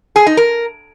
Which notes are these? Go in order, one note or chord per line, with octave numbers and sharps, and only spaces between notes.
G#4
D#4
A#4